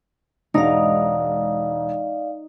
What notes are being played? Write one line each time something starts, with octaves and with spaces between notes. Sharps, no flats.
E1 G#2 D#4 D5 D#5 F5